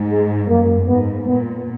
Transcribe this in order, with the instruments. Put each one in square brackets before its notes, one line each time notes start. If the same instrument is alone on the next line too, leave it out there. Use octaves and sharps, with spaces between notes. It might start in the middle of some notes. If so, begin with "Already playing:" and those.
Already playing: [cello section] G#2
[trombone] G#3
[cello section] F#2 [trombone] A#3
[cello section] G#2 [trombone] B3
[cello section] A#2 [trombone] B3